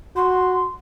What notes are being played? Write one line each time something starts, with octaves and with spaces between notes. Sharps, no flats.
F#4 C6